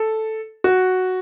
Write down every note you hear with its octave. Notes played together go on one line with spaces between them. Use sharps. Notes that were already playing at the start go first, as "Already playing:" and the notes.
Already playing: A4
F#4